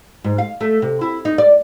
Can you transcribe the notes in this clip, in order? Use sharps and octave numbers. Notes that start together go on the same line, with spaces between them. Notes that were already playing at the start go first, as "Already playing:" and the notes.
G#2
F5
A3
C3
E4
D#4
D5